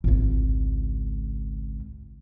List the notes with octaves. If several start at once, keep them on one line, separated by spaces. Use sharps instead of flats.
G#1 C#2